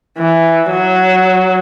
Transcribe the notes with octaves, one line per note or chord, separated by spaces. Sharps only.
E3
F#3